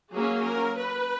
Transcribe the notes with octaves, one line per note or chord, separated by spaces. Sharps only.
F#3 A#3 C#4 G#4
A#4
B4